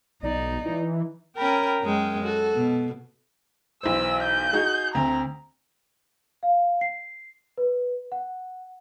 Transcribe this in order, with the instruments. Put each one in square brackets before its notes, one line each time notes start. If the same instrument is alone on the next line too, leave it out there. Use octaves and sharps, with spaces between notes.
[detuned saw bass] B1 [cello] D#4 [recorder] D5
[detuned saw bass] E3
[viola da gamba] C#4 A#4 [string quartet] G5 A#5 B5
[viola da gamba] F#2 G#3 C#4 [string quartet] G5
[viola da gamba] F#4 [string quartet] A4
[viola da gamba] B2
[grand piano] B1 E3 C5 [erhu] E6
[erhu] G6
[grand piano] D#4 F#4 G#4
[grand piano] D2 C4 [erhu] A#5
[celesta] F5
C7
B4
F#5